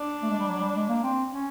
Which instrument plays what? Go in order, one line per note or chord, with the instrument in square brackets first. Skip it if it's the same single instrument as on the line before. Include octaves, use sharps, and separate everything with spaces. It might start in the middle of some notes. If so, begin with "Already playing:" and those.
Already playing: [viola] D4
[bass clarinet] A3
G#3
G3
F#3
G3
G#3
A#3
C4
C#4